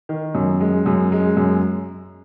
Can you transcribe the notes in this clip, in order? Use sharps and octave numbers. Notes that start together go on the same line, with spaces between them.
D#3
F#2
G#3
F#2
G#3
F#2